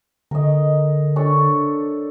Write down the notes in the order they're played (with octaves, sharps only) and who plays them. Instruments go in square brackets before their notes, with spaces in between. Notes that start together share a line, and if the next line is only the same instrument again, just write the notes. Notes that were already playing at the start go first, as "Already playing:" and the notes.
[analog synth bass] D3 [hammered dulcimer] A#4 D#5
[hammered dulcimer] D4 A4 C#5